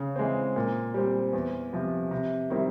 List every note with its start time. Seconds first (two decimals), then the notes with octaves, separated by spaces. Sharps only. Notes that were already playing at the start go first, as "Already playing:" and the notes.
Already playing: C#3
0.16 E3 G#3 C4
0.56 A#2
0.94 G3 C4
1.33 E2
1.73 C3 F3
2.11 C3
2.50 D#3 G3 C4 E4